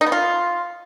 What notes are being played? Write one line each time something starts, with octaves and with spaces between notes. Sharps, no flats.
D#4
B3
F4